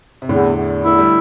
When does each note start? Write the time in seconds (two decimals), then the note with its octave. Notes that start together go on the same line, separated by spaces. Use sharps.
0.22 C3
0.29 E2 A2 D3
0.56 E2
0.83 A3 E4
0.99 G3